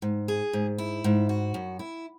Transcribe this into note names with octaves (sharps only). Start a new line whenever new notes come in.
G#2
G#4
G#2
E4
G#2
F#4
F#2
E4